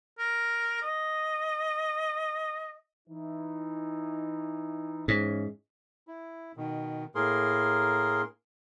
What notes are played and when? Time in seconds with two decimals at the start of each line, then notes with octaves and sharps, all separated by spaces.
0.19 A#4
0.82 D#5
3.08 E3 D#4
5.08 G#2 E3 G#3 C#4
6.07 E4
6.57 B2 D#3
7.15 A2 A#3 G#4 A#4 C6